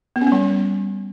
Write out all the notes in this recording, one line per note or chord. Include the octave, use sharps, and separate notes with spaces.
B3
C#4
B3
G3